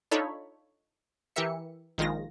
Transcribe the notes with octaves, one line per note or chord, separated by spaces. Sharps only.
D4 D#4 F4 A4 C#5 B5
E3 G4 A#4 E5 C#7
A#1 D#3 G#3 F4 A#6